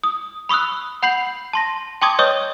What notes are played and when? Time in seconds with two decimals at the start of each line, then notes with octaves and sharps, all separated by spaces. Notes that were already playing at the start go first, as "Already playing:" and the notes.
0.03 D#6
0.49 B5 C#6 D#6 E6 F#6
1.03 F#5 B5 G6 C7 F#7
1.53 A5 C6 A#6
2.02 G5 A5 C6 D6 D#6 G#6
2.19 B4 C#5 D#5 C#6 D#6 G6